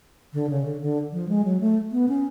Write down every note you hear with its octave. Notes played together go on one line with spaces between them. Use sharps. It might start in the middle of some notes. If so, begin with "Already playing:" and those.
D3
C#3
D3
D3
F3
G#3
F#3
A3
B3
C#4